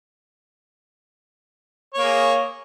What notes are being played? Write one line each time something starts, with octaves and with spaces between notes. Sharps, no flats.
A#3 G#4 C#5